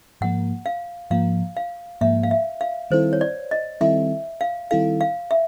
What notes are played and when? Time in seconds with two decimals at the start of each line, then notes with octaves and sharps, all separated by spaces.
0.21 G#2 F3 A#3 F#5
0.66 F5
1.11 G#2 F3 A#3 F5
1.56 F5
2.01 G#2 F3 A#3 E5
2.23 F5
2.31 E5
2.61 F5
2.91 D#3 G3 C4 E4 A4 C5
3.13 C#5
3.21 D5
3.51 D#5
3.81 D#3 G3 C4 E4 A4 E5
4.41 F5
4.71 D#3 G3 C4 E4 A4 F5
5.01 F5
5.31 E5